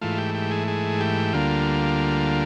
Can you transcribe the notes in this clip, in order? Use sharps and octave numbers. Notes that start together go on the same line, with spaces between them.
G#2 E3 A3 F4
G4
G4
G#4
G#4
G4
D2 D3 G3 A#3 F4